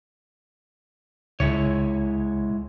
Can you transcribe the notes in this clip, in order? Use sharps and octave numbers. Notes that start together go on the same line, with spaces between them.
C#2 G#3 E4 C#5